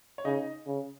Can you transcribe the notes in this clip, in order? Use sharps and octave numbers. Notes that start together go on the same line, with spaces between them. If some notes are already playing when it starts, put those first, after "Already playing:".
C#5
C#3 D#4 D#5
C#3